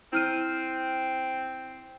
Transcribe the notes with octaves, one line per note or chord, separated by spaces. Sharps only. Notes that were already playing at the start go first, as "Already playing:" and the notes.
C4 E4 F6 D#7